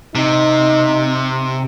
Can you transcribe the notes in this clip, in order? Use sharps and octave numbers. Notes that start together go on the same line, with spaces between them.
C3 D#4